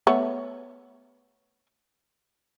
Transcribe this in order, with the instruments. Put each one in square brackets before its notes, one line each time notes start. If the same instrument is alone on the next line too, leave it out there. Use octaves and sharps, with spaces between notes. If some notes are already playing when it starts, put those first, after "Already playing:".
[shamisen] A3 B3 C#5